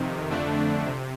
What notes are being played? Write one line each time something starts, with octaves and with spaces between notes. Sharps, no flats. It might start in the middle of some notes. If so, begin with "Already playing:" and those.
Already playing: F2 C3 D#3
F2 D3 A3 D4
C3